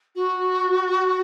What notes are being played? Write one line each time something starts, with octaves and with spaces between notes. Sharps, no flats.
F#4